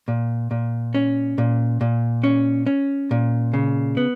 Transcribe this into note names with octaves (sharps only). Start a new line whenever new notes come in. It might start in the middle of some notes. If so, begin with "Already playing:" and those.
A#2
A#2
C#4
A#2
A#2
C#4
C#4
A#2
C#3
B3